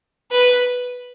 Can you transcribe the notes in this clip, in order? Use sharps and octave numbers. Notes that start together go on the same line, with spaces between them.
B4